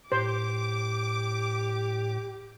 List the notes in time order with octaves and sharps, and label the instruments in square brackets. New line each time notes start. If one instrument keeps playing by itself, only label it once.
[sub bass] A2 [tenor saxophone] G4 [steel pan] C5 [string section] D6